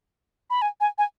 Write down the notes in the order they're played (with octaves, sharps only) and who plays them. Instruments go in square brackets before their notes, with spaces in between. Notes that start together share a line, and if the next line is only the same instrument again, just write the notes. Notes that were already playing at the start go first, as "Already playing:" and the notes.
[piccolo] B5
G#5
G#5
G#5